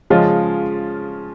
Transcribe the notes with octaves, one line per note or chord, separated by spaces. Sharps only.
C#3 F3 G#3 C#4 F4